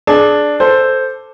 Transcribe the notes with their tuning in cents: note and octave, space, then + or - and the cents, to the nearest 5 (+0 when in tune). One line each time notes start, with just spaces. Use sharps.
D4 +0 G#4 +30
A4 +0 C5 +0